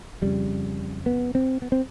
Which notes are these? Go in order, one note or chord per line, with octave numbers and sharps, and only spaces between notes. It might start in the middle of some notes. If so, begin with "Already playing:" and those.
F2 C#3 G3
B3
C4
B3
C4